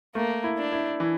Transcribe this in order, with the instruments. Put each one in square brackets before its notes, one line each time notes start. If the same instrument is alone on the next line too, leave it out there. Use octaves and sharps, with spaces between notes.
[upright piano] A3 [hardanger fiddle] A#3
[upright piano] E4
[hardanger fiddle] D4
[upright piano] E4
E3